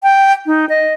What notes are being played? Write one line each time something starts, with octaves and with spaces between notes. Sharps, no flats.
G5
D#4
D#5